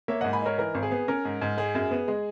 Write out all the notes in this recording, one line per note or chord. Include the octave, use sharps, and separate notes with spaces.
A#3 C#5 E5
G#2 D#5 F#5
G#5 B5
D#4 A#4 C#5
E3 A#4
G#1
G#4
B3
C#4 A#4
G#2
G#2
G#3 G#4
F#2
B3
G#3